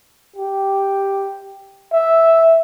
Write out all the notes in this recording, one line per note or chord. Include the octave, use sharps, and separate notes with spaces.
G4
E5